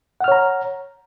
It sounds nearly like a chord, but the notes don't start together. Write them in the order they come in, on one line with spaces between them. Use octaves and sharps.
F#5 F6 C#5 A#5